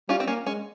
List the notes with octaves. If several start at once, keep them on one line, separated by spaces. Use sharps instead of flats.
G3 C#4 F4
C4
A#3 C#4
G#3 C#4